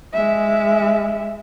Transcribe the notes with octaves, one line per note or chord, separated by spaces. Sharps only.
G#3 E5